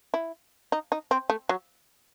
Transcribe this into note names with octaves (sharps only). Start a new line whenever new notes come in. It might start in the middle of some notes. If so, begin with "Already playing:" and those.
E4
D#4
D#4
C4
A3
F#3